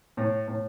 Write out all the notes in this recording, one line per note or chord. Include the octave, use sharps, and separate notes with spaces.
A2
A2